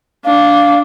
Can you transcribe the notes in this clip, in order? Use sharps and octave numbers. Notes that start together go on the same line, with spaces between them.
D4 F5